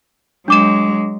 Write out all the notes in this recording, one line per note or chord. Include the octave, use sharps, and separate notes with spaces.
F#3 G#3 D4 D6 E7